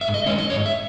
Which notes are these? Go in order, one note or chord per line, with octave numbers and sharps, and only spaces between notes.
G#2 E5
D#5
D#3 G#3 C#4 C#5
D#5
G#2 C#5
E5